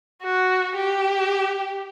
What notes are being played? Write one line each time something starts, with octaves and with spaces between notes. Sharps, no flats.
F#4
G4